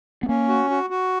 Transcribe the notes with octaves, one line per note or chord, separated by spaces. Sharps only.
B3
A#3 C#4
F#4
F#4
F#4